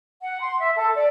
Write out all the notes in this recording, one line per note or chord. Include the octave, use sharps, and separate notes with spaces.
F#5
C6
E5
A4
D5